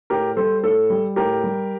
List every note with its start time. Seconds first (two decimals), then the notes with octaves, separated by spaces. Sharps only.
0.10 A2 G4 A#4
0.37 G3 A4 C5
0.63 A2 A4
0.90 G3
1.16 A2 G4 A#4
1.44 G3